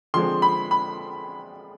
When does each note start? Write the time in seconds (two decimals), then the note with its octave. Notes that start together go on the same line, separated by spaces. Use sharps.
0.14 D3 F3 G#3 C4 C6
0.42 B5
0.71 B5